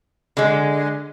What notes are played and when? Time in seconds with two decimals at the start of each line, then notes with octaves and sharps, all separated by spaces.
0.37 D3 G#3